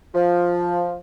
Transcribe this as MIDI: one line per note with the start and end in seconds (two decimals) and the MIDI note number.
0.15 0.95 53